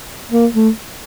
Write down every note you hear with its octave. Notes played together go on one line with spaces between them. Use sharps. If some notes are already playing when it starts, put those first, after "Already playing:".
A#3
A3